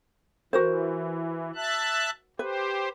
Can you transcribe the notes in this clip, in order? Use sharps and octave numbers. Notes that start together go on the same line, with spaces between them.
E3 F#4 A#4 C5
E5 A5 F#6
G4 B4 C5